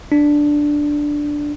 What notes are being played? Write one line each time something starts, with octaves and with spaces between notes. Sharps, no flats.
D4